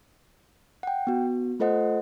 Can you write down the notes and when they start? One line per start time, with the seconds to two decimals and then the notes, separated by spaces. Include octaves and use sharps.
0.83 F#5 G5
1.07 B3 F#4
1.60 A3 F4 A4 C5 D#5 F#5